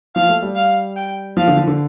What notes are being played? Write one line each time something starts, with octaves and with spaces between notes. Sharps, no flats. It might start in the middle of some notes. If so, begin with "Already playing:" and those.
F3 F5
A3
G3
F5
G5
F3 F5
D3
F3
D3